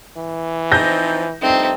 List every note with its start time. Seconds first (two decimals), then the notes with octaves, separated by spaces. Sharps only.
0.17 E3
0.72 F3 C4 D#4 G6 A#6
1.42 G2 F3 A3 C4 D#4